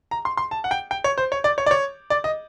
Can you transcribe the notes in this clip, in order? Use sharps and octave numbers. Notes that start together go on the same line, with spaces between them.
A#5
C6
C6
A5
F#5
G5
G5
C#5
C5
C#5
D5
C#5
D5
C#5
D5
D#5